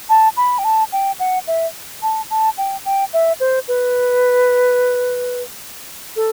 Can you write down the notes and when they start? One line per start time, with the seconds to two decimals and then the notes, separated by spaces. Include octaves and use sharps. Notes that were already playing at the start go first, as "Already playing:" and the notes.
0.09 A5
0.37 B5
0.58 G5
0.64 A5
0.92 G5
1.20 F#5
1.47 E5
2.02 A5
2.30 A5
2.58 G5
2.85 G5
3.13 E5
3.40 C5
3.68 B4
6.16 A4